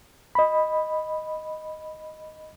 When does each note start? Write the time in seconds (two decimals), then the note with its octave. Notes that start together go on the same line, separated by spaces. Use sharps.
0.35 D#5 B5